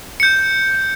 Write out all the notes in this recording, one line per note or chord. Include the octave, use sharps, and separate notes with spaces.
G6 C#7